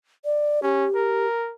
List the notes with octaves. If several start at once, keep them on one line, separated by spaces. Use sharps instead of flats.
D5
C#4 G4
A#4